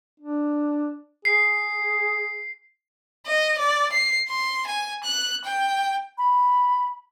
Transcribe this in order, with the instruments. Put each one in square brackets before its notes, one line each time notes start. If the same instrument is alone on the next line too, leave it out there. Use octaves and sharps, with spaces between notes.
[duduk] D4
[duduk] G#4 [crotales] C7
[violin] D#5
D5
C7
C6
G#5
F#6
G5
[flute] B5